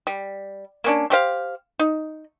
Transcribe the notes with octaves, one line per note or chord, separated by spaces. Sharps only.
G3
A#3 C#4 D4
A3 G4 C5 F5
D#4